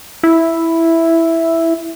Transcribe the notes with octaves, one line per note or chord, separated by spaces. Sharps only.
E4